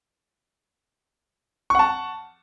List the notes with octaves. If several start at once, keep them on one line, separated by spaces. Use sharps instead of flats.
F#5 A5 C#6